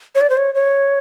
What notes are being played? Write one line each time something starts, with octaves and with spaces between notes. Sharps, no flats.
C#5
D5
C5
C#5
C#5